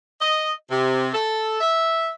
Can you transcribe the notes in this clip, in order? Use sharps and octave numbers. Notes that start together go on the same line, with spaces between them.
D#5
C3
A4
E5